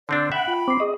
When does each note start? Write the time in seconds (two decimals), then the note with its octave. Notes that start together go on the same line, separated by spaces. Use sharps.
0.09 D3 C4 D4 C5 D5
0.32 E5 F#5 G5 B5
0.47 F4
0.68 C4 D6 C7
0.80 G#4 D#5 C#6